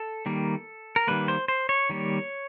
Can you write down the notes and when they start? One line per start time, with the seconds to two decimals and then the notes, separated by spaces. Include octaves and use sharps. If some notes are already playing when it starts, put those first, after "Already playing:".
Already playing: A4
0.26 D#3 G3 A#3
0.96 A#4
1.07 D#3 G3 A#3 B4
1.28 C5
1.48 C5
1.69 C#5
1.89 D#3 G3 A#3